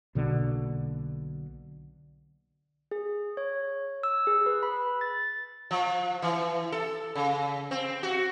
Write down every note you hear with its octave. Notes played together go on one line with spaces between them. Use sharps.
B1 B2 D3 A#3
G#4
C#5
E6
G#4
B4
B5
A6
F3
E3
A4
C#3
C4
F#4